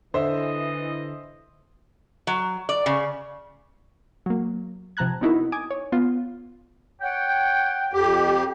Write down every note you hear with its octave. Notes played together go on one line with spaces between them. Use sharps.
D3 E3 C5 D#5 E5
F#3
D5
C#3
F#3 A#3
C3 F3 A5 A#5 F#6 G#6
B3 C4 D#4 E4 F#4 A#4
G#5 D6 D#6 G#6
C#5
B3 F4
C#5 F#5 G5
F2 G4